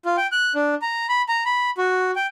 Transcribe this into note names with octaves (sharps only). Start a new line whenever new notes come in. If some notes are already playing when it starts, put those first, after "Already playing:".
F4
G5
F#6
D4
A#5
B5
A#5
B5
F#4
G5